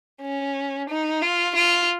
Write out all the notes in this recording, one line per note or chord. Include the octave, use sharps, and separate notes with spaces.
C#4
D#4
F4
F4